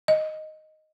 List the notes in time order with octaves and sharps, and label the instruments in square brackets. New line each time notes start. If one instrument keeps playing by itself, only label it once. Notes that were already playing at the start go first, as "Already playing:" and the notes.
[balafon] D#5